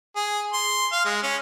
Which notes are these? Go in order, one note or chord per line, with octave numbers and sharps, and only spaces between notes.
G#4
C6
F5
G#3
C#4